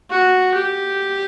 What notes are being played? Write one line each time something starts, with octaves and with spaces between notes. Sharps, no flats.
F#4
G4